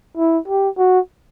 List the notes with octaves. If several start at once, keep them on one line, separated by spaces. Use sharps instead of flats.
E4
G4
F#4